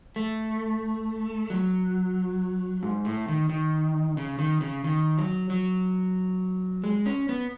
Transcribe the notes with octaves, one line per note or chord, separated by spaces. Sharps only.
A3
F#3
G#2
A2
D#3
D#3
C#3
D#3
C#3
D#3
F#3
F#3
G#3
C#4
B3